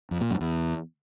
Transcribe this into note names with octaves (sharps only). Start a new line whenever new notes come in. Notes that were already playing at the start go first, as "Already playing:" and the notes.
F2
A#2
F#2
E2